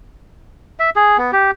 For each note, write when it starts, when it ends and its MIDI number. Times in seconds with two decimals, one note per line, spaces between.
0.79 0.90 76
0.96 1.17 68
1.18 1.31 59
1.32 1.51 67